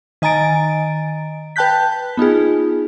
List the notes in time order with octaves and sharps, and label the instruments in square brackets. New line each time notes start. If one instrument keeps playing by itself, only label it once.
[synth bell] D#3 D#5 G#5 A#5 A6 D7
B4 G5 A5 F#6 G6 B6
B3 D#4 F4 G#4